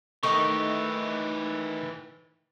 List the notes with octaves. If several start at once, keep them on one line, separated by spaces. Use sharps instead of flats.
D#3 E3 A3 D#4 G4 C#6